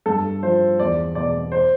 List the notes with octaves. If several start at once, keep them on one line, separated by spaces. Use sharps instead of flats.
G2 A4
F3 C5
E2 D5
B2 D5
C5